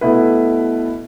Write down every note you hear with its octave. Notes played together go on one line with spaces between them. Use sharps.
B2 A3 E4 B4